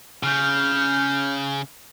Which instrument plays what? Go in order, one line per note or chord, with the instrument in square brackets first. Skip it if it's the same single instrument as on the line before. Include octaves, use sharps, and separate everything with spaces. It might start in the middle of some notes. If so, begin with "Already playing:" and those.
[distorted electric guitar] C#3 [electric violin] F6 G6